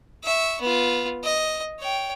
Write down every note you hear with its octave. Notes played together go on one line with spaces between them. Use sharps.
E5 C#6
B3 F4
D#5
C#5 G5